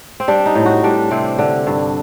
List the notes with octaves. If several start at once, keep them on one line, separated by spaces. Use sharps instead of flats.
C4
G3 D4
D#4
A2
F#4
G3 D4
C3 C4
D3
G2